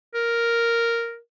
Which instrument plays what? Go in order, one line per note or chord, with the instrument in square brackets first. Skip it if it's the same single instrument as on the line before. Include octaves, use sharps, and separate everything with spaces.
[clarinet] A#4